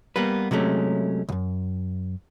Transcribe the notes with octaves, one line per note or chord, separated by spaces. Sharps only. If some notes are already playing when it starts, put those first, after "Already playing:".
G3 A#3 B3 B4
C3 F#3 G#3 A3 C#4
C2 F#2